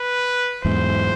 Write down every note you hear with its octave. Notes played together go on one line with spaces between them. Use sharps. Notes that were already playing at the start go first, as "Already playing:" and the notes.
Already playing: B4
E2 G#2 C5